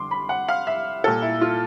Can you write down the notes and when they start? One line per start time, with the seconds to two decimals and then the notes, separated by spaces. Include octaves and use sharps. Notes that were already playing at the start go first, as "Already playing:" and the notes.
Already playing: F2 D3 G3 C6 D6
0.11 B5
0.29 F#5
0.48 F5
0.67 E5
1.04 A#2 G3 A4
1.22 E4
1.41 F4